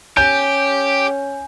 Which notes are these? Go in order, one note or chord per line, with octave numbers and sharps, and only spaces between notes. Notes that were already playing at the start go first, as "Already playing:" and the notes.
C#4 G4 G#5 G6